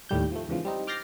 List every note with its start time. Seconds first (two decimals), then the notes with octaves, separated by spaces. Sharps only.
0.09 D#2 A2 G3 G6
0.32 F3 A3
0.49 E2 G#2 C#3 E3 F3
0.65 G3 C4 D#4
0.87 D6 F6 G6 A6 A#6 C7